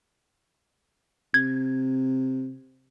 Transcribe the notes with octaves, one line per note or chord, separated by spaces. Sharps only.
C3 G#6